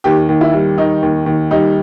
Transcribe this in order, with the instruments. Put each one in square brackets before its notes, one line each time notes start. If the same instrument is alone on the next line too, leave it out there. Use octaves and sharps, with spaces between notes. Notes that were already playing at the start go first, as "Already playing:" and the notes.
[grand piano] D#2 G4
D#2
E4
G3
D#3 D#4
D#2
D#2
G3 D#4